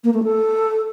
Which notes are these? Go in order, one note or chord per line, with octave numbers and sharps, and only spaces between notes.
A#3
A3
A4